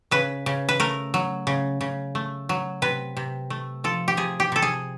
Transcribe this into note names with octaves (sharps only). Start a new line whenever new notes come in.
C#3 B4
C#3
B4
A3 A#4
F#3
C#3
C#3
A3
F#3
C3 B4
C3
A3
F3 A4
G4
C3 G#4
G4
C3 A4
G#4